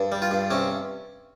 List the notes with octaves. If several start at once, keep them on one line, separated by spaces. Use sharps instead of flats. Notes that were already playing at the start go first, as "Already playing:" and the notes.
Already playing: G2
G3
F4
G2
C3 C#4